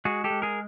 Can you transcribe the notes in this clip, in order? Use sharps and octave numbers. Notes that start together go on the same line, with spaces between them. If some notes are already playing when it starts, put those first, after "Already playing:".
G#3 F#4 G#4
G4 A4
G#3
G#4 A#4